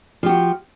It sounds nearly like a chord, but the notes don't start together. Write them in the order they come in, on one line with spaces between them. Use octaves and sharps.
F3 G4 F#4